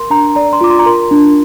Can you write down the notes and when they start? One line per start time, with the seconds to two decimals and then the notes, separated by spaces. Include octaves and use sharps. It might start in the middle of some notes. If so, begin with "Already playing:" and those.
Already playing: A#4 C6
0.10 D4 A#5
0.35 D5 A#5
0.53 C6
0.61 F4 D6
0.70 C6
0.79 A#5
0.86 A#4 C6
1.11 D4